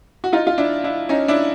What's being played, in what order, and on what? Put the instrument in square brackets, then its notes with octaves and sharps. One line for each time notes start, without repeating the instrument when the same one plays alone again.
[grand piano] F#4
D#4 F4
F4
D4 E4
D4 E4
C#4 D#4
D4 E4